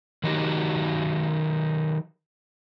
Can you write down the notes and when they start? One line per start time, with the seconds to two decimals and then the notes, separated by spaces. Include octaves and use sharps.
0.23 D#3 F#3 D#4 F#4 G4